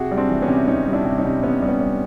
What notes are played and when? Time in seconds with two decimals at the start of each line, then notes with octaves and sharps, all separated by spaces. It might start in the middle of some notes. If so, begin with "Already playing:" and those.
Already playing: C3 F#4 G#4
0.11 G3
0.17 C4 D4
0.29 E3
0.42 B3 C#4
0.48 C3
0.68 C3 C#4 D#4
0.87 G3
0.93 D4 E4
1.05 C3
1.18 C#4 D#4
1.25 C3
1.43 C3 B3 C#4
1.62 G3
1.68 B3 C#4
1.81 G3